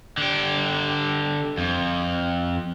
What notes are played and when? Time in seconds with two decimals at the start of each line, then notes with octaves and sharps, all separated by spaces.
0.18 D3 G4
1.58 F2